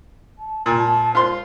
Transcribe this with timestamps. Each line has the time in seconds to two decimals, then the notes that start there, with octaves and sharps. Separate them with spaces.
0.38 A5
0.66 A#2 G#5
0.77 A5
1.15 F4 C5 C6